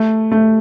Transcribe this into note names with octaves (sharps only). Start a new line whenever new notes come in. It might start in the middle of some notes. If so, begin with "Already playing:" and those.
Already playing: A3
A3